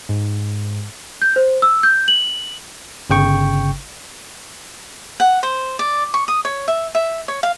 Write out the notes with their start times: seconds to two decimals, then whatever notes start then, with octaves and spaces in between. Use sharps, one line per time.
0.09 G#2
1.22 G6
1.36 C5
1.62 E6
1.83 G6
2.08 F#7
3.10 G1 C#3 G5 C#6
5.20 F#5
5.43 C5
5.79 D5
6.14 C#6
6.28 D#6
6.45 C#5
6.68 E5
6.95 E5
7.28 C#5
7.43 F5